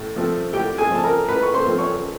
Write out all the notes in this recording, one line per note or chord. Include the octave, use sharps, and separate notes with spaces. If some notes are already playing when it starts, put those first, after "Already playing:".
Already playing: A2
F3 A3 C4
A2 G4 G5
G#4 G#5
F3 A3 C4 A5
A#4 A#5
A2 B4 B5
C#6
C5 C6
F3 A3 C4
C#5 C#6